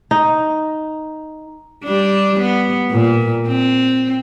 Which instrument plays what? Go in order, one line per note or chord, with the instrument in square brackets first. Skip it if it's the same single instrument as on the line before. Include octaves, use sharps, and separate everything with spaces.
[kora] D#4
[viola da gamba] G3 D4
B3
A#2
C4